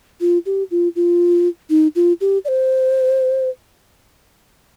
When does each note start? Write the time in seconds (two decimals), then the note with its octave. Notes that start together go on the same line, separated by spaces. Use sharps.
0.20 F4
0.46 G4
0.71 F4
0.96 F4
1.70 D#4
1.95 F4
2.21 G4
2.45 D5
2.48 C5